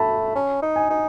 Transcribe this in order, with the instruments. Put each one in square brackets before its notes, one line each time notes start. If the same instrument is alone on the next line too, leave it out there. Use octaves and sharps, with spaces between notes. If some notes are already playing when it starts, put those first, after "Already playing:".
Already playing: [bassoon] A3 [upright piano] A5 B5
[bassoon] C#4
D#4
[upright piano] G#5
[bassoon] D#4